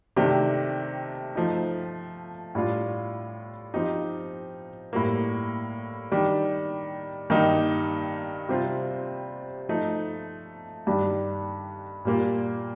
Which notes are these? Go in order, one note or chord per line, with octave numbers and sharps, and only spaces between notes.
C3 D#3 A3 D4 G4
F3 A3 D#4
A2 G3 D4 F4
F3 C4 D#4 G4
A2 G3 A#3
D#3 G3 D4
G2 D#3 A#3 D#4 G4
C3 G3 C4 F4
F3 A3 D#4
G2 D#3 G3 D4
A#2 G3 A#3 F4